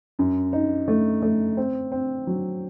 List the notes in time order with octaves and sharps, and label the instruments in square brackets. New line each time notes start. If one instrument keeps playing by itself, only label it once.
[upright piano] F#2
D#4
A3
A3
C4
C4
F#3